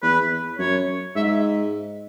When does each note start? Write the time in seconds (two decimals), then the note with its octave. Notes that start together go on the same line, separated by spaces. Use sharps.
0.02 E2 B4
0.59 F#2 C#5
1.15 G#2 E5